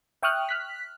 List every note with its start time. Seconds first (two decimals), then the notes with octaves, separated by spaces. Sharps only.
0.23 E5 G5 C#6 D#6 F6 F#6
0.49 F6 F#6 B6